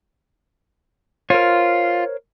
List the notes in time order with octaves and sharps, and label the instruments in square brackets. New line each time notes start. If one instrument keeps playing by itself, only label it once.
[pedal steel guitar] F4 [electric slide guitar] A#4 C5 C#5